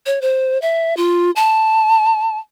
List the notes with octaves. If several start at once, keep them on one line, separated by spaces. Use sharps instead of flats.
C#5
C5
E5
F4
A5